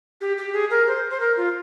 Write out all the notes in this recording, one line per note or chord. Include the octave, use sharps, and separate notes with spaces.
G4
G4
G#4
A#4
C5
C5
A#4
F4